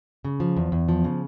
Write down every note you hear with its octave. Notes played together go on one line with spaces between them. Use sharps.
C#3
F3
E2
E2
F3
C#3